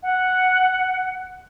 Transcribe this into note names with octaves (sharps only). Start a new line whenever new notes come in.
F#5